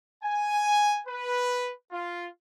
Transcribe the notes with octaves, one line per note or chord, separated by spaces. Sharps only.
G#5
B4
F4